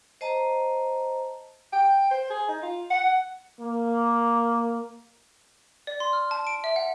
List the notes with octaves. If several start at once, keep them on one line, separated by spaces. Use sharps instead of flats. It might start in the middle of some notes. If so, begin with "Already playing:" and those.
C5 D#5 A5 A#5
G5
C5
G#4
D#4
F4
F#5
A#3
D5
C6
F6
A5
D7
E5
F#5